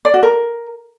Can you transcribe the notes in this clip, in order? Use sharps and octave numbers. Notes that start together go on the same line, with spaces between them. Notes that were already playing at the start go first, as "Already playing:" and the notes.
D5
F#4
A#4